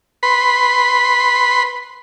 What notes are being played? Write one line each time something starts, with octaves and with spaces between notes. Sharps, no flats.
B4 B5 C6